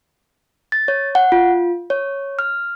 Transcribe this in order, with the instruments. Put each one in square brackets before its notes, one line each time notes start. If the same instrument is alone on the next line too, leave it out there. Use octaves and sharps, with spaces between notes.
[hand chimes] A6
C#5
F#5
F4
C#5
F6